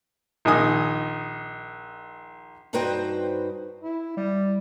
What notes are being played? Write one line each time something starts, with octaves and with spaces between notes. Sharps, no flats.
A#1 D#3 D#4 G#5 D#6
G2 D#4 F#4 B4 C5 G5
E4
G3